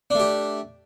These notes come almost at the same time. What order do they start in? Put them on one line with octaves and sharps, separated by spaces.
D4 A3 G4